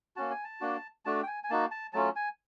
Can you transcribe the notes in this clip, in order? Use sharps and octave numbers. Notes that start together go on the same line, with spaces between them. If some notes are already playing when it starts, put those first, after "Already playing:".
A#3 C#4 F#4 A5
G#5
A5
A#3 D4 F#4
A3 D4 F#4 A5
G5
G#5
G#5
A#3 D#4 F#4 A5
A5
F#3 A3 C#4 F4 A5
G#5